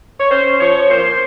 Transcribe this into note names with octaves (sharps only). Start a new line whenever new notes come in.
C#5
C#4 C5
F3 C#5
A#3 C5